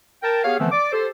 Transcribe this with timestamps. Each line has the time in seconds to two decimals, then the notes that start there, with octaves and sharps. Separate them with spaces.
0.23 A#4 G5 A5
0.44 B3 G4 G#4 C#5 F5
0.59 D3 E3 F3 A3 B3 C4
0.71 D5 D6
0.92 G4 A4 C5